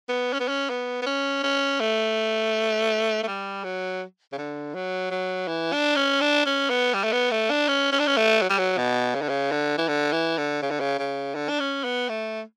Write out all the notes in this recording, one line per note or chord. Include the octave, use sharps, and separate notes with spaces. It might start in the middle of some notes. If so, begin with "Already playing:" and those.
B3
C#4
B3
C#4
B3
B3
C#4
C#4
A3
A3
G3
F#3
C#3
D3
F#3
F#3
E3
D4
C#4
D4
C#4
B3
G3
A3
B3
A3
D4
C#4
C#4
D4
C#4
A3
F#3
G3
F#3
B2
C#3
D3
C#3
D3
E3
D3
E3
D3
C#3
D3
C#3
C#3
D3
D4
C#4
B3
A3